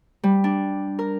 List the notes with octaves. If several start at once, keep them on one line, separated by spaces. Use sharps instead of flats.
G3
D4
A#4